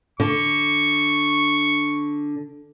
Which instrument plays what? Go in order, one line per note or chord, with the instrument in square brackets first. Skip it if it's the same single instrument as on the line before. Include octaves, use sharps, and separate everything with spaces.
[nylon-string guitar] D3 [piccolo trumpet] C#6